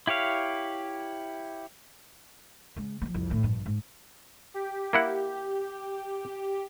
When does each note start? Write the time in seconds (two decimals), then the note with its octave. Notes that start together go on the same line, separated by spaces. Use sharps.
0.07 E4 G4 C#5 F5
2.76 C#3 G#3
3.02 F3 A3
3.14 C2 F2
3.30 A2 D3
3.43 A#1 G2
3.66 G#2
4.54 G4
4.93 A#3 E4 F#5